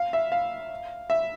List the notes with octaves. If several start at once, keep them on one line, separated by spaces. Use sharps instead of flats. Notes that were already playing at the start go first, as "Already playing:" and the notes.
Already playing: F5
E5
F5
E5